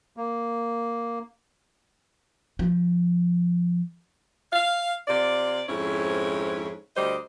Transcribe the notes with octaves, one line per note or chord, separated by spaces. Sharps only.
A#3
F3
F5
C3 F4 D5
F2 G#2 C#4 E4 C#5
D2 G3 C5 D#5